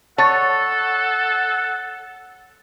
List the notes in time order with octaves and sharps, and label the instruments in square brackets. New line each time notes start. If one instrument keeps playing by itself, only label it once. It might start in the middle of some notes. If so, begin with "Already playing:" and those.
[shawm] A4 [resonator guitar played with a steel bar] C#5 [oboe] F#5 [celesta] A5 A6